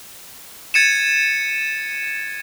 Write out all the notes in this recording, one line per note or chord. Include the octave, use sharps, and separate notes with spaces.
G#6 A6 C#7 D#7 E7